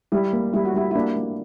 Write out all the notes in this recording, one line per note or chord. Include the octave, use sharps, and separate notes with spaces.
G3 E4
A#3
G3 E4
F#4
G3 E4
E4
A#3 D4
A#3